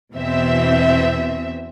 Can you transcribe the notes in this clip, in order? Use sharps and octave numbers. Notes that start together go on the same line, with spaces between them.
E2 B2 E3 C4 E5